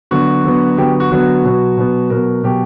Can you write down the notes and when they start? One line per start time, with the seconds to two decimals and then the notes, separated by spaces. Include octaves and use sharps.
0.11 D3 F#3 B3 F#4
0.45 D3 F#3 B3
0.78 D3 F#3 B3 G4
1.00 F#4
1.11 D3 F#3 B3 F#4
1.44 B2 F#3 B3
1.77 B2 F#3 B3
2.10 B2 F#3 B3 A#4
2.44 B2 F#3 B3 G4